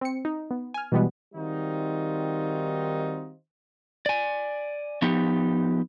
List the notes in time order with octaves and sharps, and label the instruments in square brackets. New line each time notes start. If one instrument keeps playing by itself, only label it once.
[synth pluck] C4 C#7
D#4
B3
G#5 F6
B2 E3 G3 G#3 B3
[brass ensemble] D#3 G3 C4 D#4 F4 F#4
[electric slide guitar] D5 G#5
F3 B3 D#4 G4